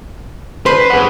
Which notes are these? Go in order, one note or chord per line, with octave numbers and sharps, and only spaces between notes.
B4 C5
G#4 F#5